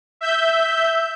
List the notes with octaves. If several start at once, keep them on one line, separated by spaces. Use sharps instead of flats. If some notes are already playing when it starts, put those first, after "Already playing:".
E5 G6